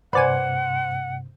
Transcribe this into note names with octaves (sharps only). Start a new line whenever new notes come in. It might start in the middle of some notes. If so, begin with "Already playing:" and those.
G2 C3 B4 C5 D5 F#5 G#5